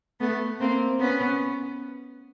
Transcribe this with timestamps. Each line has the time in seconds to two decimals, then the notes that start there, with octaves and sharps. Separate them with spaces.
0.20 A3 B3
0.60 A#3 C4
1.00 B3 C#4